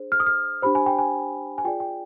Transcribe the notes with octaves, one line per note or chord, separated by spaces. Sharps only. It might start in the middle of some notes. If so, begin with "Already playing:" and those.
Already playing: D4 G#4 C5
F6
D#6
F6
D4 G4 C5 B5
G#5
G5
G#5
G#5
F4 G#4 D5 G5
G5